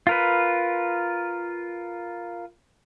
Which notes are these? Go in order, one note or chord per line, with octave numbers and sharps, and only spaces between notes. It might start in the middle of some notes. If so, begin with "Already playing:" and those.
F4 A#4 B4